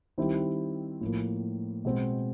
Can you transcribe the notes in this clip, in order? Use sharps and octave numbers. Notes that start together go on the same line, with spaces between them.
D#3 G3 C4 E4 G4
A2 F3 A#3
B2 G#3 C4